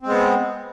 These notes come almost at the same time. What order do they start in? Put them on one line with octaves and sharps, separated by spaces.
C4 G#3 B3